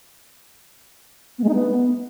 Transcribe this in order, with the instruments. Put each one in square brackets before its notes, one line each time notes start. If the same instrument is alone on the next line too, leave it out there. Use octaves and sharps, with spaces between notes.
[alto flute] B3
G#3
D#4
B3